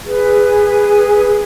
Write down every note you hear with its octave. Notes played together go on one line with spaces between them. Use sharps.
G#4 B4